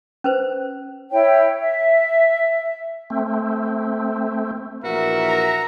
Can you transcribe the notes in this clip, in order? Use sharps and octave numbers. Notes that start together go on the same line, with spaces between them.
C#4 B4 C5
E4 C#5 G5
E5
A3 C4
A#1 E3 F#4 A#4 E5
A#5